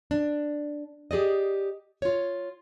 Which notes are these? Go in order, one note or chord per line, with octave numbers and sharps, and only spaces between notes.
D4
G4 G#4 D5 D#5
F4 C#5